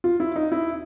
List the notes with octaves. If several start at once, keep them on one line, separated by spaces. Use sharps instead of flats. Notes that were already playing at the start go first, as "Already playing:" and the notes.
F4
E4
D#4
E4